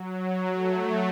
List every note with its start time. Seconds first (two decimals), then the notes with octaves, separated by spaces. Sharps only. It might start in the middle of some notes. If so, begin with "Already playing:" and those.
Already playing: F#3
0.53 A3